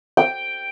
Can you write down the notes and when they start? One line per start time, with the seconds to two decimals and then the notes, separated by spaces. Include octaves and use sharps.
0.17 G5